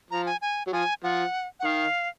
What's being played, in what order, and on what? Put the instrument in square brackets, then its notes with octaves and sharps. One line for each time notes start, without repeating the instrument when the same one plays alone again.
[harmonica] F3 [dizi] A#5
[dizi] G#5
G#5
[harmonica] F#3
[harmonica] F3 [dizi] G#5
[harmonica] F3 [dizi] F#5
[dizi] F#5
[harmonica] D#3 [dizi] F5